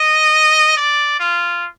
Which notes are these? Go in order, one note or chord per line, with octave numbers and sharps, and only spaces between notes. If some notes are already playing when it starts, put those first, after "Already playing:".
Already playing: D#5
D5
F4